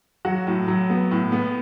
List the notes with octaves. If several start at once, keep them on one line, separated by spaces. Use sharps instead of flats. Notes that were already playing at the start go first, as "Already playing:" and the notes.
F#3 F#4
A2
F#3
B3
A2
B3